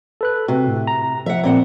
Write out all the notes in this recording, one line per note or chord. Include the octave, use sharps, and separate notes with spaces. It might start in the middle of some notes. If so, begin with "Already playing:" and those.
A4 B4 F#6
C3 F#4
A2
A#5
F3 E5 F#5
A#2 C4 F#5